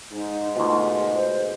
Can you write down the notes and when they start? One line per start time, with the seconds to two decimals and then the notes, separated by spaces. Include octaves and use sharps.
0.13 G#2 G#3 D#4
0.56 D2 B2 F4
1.13 C5